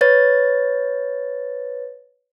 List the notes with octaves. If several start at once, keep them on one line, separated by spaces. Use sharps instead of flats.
B4 C#5 A6